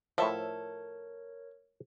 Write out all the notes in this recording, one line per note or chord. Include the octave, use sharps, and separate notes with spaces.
A2 F3 A4 A#4 C#5 E5